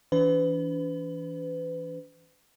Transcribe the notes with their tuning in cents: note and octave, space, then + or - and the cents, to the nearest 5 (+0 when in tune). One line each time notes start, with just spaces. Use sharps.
E3 +0 D4 -45 B4 +35